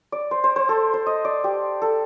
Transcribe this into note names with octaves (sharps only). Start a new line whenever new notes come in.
D5
C5
C5
C5
A4
C5
D#5
D5
G4
A4